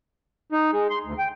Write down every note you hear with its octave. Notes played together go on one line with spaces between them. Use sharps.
D#4
G#3
C6
D2
G5